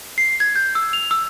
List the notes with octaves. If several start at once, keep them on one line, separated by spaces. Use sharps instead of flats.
C7
G#6
G6
E6
F7
E6